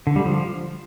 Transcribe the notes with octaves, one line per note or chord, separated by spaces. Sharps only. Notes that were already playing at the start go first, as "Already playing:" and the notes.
D3
G3
F3